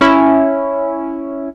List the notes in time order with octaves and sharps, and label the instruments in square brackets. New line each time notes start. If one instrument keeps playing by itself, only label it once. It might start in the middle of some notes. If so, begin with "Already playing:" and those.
[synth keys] C#4 E4